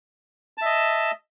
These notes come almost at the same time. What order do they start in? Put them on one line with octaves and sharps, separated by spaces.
A5 E5 D#5